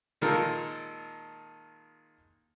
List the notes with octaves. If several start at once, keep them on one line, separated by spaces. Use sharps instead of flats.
A#2 D#3 G#3 F4 A4 A#4